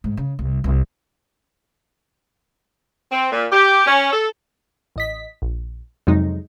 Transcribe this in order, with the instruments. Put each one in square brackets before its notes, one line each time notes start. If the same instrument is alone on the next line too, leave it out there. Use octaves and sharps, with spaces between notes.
[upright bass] G#2
C#3
C2
C2
[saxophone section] C4
A#2
G4
C#4
A4
[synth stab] A1 D#5 B6
A#1
F2 C3 F#3 G#3 D#4